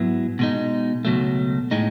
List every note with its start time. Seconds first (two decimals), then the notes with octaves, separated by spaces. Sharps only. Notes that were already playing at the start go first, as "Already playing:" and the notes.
Already playing: G#2 F#3 B3 E4
0.39 B2 G#3 D#4
1.05 C#2 B2 F#3 A3
1.71 A2 G#3 D#4